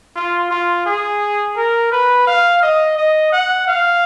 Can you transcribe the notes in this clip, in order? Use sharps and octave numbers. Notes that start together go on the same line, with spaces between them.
F4
F4
G#4
A#4
B4
F5
D#5
D#5
F#5
F5